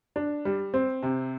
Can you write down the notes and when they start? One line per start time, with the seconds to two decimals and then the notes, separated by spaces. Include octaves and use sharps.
0.16 D4
0.45 G3
0.74 C4
1.03 C3